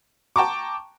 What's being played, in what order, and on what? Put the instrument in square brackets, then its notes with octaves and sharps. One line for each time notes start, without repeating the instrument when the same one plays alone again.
[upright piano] G5 A5 A#5 C#6 D6